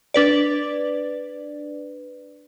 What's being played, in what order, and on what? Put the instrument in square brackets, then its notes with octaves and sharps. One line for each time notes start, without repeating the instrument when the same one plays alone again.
[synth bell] D4 B4 D5